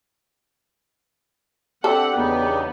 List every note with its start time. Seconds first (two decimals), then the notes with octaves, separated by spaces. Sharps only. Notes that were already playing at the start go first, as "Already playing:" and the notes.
1.84 C4 D4 G4 A4 E5 F#5
2.17 E2 C#3 B3 D#4